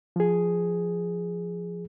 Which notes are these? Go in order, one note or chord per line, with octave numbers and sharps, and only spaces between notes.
F3 G#4